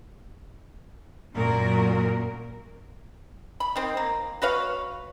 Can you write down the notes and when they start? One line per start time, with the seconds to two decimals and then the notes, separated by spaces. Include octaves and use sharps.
1.36 F#2 A#2 F#4 A#4
3.60 B5
3.76 D#3 C4
3.97 A#3
4.42 F#4 B4 C#5 F5